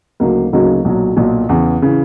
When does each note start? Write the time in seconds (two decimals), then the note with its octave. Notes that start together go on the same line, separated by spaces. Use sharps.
0.20 D2 C#3 F#3 A#3 D#4
0.52 D2 C#3 F#3 A#3 D#4
0.85 B1 A#2 F#3
1.17 B1 A#2 F#3
1.49 E2 C#3 E3
1.82 C#3 E3